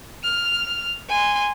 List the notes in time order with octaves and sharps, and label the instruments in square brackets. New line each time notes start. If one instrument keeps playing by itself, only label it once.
[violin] F6
G#5 C6